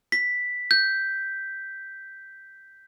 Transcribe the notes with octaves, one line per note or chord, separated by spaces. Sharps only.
B6
G6